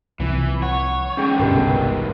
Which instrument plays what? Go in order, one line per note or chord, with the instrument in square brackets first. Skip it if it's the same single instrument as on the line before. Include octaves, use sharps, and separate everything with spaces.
[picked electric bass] C2 C3 F3 [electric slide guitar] E3
[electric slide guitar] C#5 [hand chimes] F#5
[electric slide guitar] G#2 D3 [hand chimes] C#4 G#4 G5
[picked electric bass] G1 C2 B2 [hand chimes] G4 A#4 B4